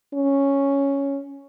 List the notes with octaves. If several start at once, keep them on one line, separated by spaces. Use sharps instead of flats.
C#4